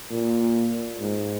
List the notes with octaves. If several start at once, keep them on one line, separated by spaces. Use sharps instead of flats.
A#2
G#2